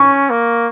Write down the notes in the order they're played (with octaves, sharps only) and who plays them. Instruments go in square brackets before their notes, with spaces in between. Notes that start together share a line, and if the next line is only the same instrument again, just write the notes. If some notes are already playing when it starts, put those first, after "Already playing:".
Already playing: [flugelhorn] C#4 [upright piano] C#6
[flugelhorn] A#3